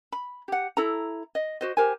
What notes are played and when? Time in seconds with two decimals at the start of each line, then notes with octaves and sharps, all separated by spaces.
0.12 B5
0.48 G4 F#5
0.77 E4 A4 A#5
1.35 D#5
1.61 F#4 C5 D#5
1.77 G4 A#4 C5 G#5